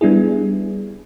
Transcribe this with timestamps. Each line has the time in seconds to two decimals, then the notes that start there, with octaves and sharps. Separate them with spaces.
0.01 G3 B3 D4 E4 G#4